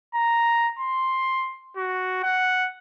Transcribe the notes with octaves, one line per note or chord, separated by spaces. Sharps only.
A#5
C6
F#4
F#5